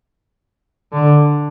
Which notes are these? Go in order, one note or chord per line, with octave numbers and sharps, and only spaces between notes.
D3